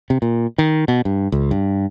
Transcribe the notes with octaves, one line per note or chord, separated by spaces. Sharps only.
C3
A#2
D#3
B2
G2
C#2
G2